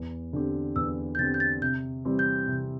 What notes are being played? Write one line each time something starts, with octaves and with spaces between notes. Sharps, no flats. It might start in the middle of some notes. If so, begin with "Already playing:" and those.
Already playing: E2
D3 C4 G4
E2 E6
G6
D3 C4 G4 A6
G6
A6
C3 G6
E3 G3 C4 G4
G6
C3